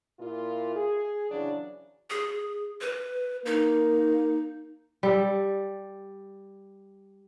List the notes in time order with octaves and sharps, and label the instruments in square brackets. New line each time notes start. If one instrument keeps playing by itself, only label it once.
[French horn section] A#2 E4 F4
G#4
C#3 E3 F#3 D4
[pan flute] G#4
B4
[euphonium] A#3 [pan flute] D#4
[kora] G3 A4